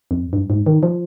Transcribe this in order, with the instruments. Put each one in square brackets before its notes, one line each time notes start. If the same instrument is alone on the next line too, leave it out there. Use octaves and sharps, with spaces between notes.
[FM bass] F2
G2
G#2
D#3
F3